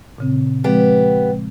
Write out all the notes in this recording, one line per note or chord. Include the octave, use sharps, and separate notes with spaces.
A#2 C#3 C4
F3 G#3 B3 C4 G4